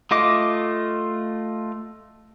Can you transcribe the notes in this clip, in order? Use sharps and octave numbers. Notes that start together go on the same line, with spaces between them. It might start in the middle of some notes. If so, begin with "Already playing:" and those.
A3 F4 D#5 D6